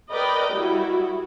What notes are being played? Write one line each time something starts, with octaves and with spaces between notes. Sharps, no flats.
A#4 B4 D5 D#5 G5
G3 E4 F#4